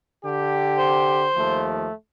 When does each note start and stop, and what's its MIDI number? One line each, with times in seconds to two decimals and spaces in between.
0.25 1.26 50
0.25 1.26 67
0.78 1.67 72
1.36 1.89 39
1.36 1.89 53
1.36 1.89 57